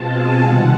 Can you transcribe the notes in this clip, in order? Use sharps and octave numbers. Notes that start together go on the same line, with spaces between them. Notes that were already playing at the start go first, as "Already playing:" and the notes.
Already playing: B2 G#3 C4 F4 A5
G#5
C3 D#3 G3 F#5